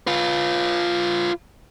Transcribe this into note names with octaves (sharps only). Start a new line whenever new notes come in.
F4 B4